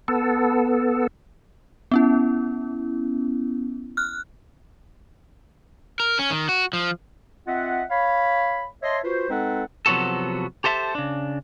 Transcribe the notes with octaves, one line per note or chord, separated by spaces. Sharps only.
B3 A4
B3 C#4 E4
F6 F#6
A#4
C#4
D#3
F#4
F3
C4 F4 D#5 E5 F#5
C#5 F5 B5
C#5 D#5 E5 A5 C6
F4 F#4 B4 C5
G#3 C4 D#4 A4 B4 F#5
C3 F3 F#3 B3 F#4 A4
G4 A4 C5 E5 F5 A5
C#3 D4